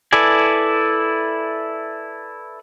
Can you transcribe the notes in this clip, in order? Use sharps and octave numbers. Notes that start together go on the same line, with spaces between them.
E4 A4 B4 D5 G#5